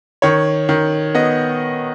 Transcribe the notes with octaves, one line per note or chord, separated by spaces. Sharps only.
D#3 C#5
D#3
B3 D#5